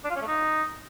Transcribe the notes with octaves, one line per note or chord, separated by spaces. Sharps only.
D4
F4
C#4
A3
D#4